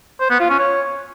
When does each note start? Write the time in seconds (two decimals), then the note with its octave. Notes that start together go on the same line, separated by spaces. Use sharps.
0.20 C5
0.30 B3
0.40 F4
0.50 C#4
0.59 C#5